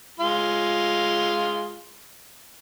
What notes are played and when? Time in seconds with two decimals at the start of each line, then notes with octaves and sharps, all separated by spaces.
0.20 G#3 F4 C6